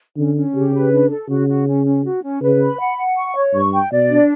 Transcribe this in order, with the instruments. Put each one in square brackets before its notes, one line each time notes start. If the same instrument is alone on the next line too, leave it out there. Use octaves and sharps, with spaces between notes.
[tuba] D3 [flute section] C#4
[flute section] C#4
[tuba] C#3 [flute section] G4
[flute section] B4
D4
A4
[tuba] C#3 [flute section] F#4
[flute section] F#4
C#4
C#4
F#4
C#4
[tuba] C#3 [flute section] B4
[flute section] B5
F#5
F#5
C#6
C#5
[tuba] G2 [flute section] C#6
[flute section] G5
[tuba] B2 [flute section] D5
[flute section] D4